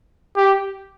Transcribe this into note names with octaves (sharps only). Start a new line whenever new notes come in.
G4